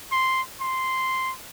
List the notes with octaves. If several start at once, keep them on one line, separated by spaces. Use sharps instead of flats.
C6
C6